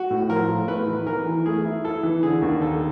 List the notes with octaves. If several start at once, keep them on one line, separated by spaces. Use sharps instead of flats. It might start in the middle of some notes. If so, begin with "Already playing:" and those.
Already playing: F#4
A2
F3 A#4
A2
A3 B4
E3
E3 A#4
E3
A3 G#4
E4
E4 A4
E3
D3 G#4
D#2
D#2 A4